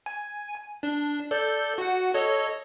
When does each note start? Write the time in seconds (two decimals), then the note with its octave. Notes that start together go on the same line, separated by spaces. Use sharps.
0.06 G#5
0.83 D4
1.31 A4 D5 G6
1.78 F#4 F#5
2.14 A4 C#5 D#5